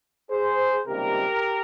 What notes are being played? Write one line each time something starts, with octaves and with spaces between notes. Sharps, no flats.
G#4 C5
C#2 C3 D#3 G3 A#3 G4 A#4